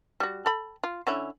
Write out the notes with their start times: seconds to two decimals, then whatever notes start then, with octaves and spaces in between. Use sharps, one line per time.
0.20 G3 F#4
0.46 A4 B5
0.84 F4
1.07 D3 C#4 E4